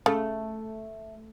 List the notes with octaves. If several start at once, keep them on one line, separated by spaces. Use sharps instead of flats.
C#3 A3